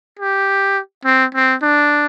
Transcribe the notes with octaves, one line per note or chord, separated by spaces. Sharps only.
G4
C4
C4
D4